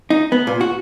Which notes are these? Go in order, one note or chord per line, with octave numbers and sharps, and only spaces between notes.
D#4
B3
A#2
F#4